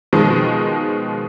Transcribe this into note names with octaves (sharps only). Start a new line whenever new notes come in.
B2 D#3 F3 G#3